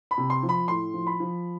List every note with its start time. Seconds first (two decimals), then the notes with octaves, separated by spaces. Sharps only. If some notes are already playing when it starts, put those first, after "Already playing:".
0.11 B5
0.18 C3
0.30 C6
0.43 F3
0.49 B5
0.68 A2 C6
0.94 F3
1.07 B5
1.20 F3